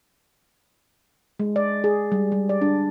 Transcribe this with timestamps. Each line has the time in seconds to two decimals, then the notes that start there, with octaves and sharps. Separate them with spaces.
1.40 G#3
1.56 D5
1.84 G#4
2.12 G3
2.32 G3
2.49 D5
2.61 D4